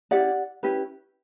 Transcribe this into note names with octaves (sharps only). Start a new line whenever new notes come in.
C#4 E4 G4 D5 F#5
C#4 E4 G4 B4